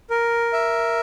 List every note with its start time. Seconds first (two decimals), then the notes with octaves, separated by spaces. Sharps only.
0.10 A#4
0.53 E5